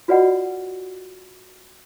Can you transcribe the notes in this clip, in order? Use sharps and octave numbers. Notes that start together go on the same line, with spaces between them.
F4 F#4 B4 D5 D#5 F#5